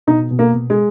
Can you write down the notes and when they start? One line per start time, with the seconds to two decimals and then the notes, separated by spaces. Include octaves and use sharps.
0.07 B2 D#4
0.31 B2
0.39 A#3
0.54 B2
0.70 G#3